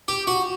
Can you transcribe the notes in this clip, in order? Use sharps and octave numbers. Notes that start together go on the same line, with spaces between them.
G4
F#4